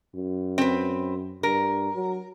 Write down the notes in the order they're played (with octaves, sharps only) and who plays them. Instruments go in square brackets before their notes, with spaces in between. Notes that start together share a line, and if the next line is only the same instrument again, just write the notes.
[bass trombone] F#2
[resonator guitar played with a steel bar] C4 B4
[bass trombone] G2 [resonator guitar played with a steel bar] A#4
[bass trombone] F#3